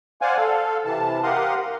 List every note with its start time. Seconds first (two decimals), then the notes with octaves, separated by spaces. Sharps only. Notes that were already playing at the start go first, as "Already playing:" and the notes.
0.22 C5 D5 F5 F#5 G#5
0.37 A4 F5
0.85 C3 E3 A5
1.23 G4 A#4 F5 F#5 C6 D#6
1.62 F5